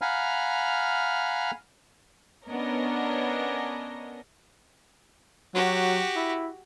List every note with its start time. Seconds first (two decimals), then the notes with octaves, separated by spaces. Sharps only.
0.02 F5 F#5 G#5 A#5 B5 F6
2.48 B3 C#4 D4 A#4 C#5 D#5
5.55 F#3 F#4 G4
6.16 E4